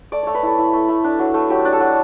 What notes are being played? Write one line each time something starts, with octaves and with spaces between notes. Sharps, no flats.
A3 D5
A3 C#5
B4
E4 A4
E4
A3
A3
D4
F#3
A3
F#3 G4
D4
A4
F#3